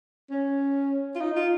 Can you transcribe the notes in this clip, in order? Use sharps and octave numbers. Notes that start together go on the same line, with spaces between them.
C#4
F4
D#4
F4